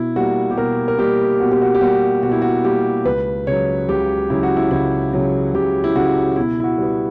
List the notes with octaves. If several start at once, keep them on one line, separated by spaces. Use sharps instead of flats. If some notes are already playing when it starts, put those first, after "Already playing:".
Already playing: B2 E4
G3 A#3 F#4
G4
B2 A#4
A#4
G3 A#3 G4
B2 F#4
G4
F#4
G4
G3 A#3 F#4
B2 F#4
E4
F#4
G3 A#3 G4
C#2 B4
C#3 F#3 C#5
C#2 G4
C#3 F#3 E4
F#4
E4
C#2 E4
C#3 F#3
C#2 G4
E4
C#3 F#3 F#4
B2 E4
E4
F#4
G3 B3